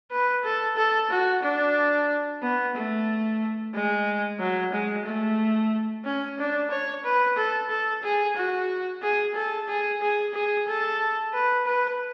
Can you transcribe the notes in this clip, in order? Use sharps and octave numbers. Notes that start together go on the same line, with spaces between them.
B4
A4
A4
F#4
D4
B3
A3
G#3
F#3
G#3
A3
C#4
D4
C#5
B4
A4
A4
G#4
F#4
G#4
A4
G#4
G#4
G#4
A4
B4
B4